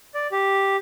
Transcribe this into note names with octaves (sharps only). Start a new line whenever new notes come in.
D5
G4